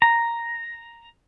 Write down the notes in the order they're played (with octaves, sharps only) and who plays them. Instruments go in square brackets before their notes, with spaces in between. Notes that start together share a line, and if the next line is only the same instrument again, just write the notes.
[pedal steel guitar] A#5